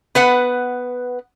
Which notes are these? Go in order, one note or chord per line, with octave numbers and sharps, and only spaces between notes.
B3 B4 F#5